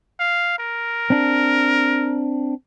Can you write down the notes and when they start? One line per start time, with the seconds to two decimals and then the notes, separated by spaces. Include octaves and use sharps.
0.20 F5
0.58 A#4
1.10 C4 D4